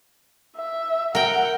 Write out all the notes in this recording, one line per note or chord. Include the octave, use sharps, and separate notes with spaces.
E5
A#4 F#5 G5